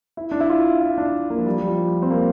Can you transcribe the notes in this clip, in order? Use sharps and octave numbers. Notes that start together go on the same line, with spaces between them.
E4
D4
E4
F4
E4
D4
A#3
F3
G3
G3
F3
C4
A#3